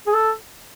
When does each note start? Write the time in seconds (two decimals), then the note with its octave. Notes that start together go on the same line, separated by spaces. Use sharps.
0.07 G#4
0.14 A4